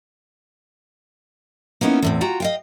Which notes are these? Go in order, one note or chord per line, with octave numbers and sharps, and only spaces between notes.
A#3 B3 C#4 D#4 E4
E2 A2 C4
F4 F#4 G5 A#5
D#5 F5 G5